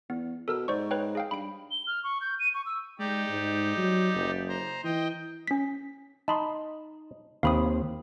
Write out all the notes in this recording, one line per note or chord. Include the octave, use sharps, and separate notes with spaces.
E2 B3
B2 A4 A#4 E6
G#2 C5 D5 C#6
B4 C#5 G5
G#4 F5 G5
G2 B5 D7
G7
F6
C#6
G6
D#7
C#6
E6
G#3 D#4 G4 D5
G#2
F#3
F#1
C5 A#5
E3 D#5 G5
C#4 B6
D#4 A5 B5 C6
D#2 C4 F5 B5 D#6